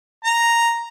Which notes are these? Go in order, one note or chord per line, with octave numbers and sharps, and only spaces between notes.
A#5